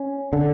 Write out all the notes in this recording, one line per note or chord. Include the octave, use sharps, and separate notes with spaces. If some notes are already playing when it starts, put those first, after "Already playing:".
Already playing: C#4
D3